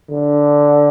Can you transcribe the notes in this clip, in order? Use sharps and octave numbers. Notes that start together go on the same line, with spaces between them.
D3